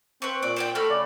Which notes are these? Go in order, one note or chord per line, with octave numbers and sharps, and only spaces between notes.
C4 B4 C#6
A#2 D5
C5 D5 G5
A3 F#4 B5 F6
C#3 D5